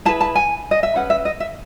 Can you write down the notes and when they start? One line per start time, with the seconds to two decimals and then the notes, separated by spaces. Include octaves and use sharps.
0.05 E4 G#4 B4 A5
0.21 A5
0.35 G#5
0.71 D#5
0.83 E5
0.95 C#4 G#4 B4 F#5
1.10 E5
1.25 D#5
1.40 E5